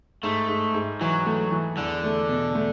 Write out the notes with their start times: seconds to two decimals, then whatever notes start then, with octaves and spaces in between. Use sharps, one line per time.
0.23 G#2 A3
0.48 G#2
0.74 G#2
1.01 E3 F#3
1.26 A3
1.51 E3
1.77 E2 D3
2.04 A3
2.29 B2
2.55 A3